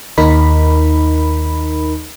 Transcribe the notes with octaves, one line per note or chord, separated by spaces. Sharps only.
D#2 D#4 A#4 B5